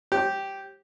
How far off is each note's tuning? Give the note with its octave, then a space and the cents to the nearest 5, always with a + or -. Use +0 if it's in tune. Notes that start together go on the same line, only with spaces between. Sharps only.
G4 -5 C#5 -45